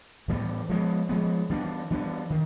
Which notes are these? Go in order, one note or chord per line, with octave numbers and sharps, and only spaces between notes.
A2 E3 G3 B3
F3 G#3 B3
F3 G#3 B3
E3 G3 B3 D4
E3 G3 B3 D4
D#3